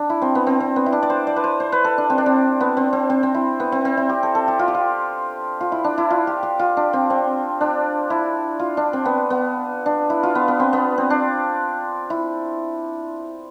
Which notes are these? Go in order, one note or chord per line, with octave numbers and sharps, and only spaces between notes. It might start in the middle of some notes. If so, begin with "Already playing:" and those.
Already playing: D4
E4
C4
B3
C4
C4
B3
E4
D4
D5
C5
D5
B4
C5
C5
B4
A4
D4
C4
D4
C4
B3
C4
C4
C4
C4
E4
B3
C4
C4
E4
G4
A4
A4
G4
F4
G4
F4
F4
E4
D4
E4
F4
G4
G4
F4
D4
C4
C4
D4
E4
F4
D4
C4
B3
B3
D4
E4
F4
B3
B3
C4
B3
C4
D4
E4